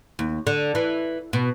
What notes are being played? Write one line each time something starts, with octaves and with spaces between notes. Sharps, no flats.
D#2
D3
E3
B2